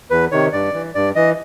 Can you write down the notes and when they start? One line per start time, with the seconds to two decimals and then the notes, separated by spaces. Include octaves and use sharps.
0.10 E2 B4
0.31 C3 D#3 C#5
0.53 G2 D5
0.74 E3
0.95 G2 D5
1.15 E3 D#5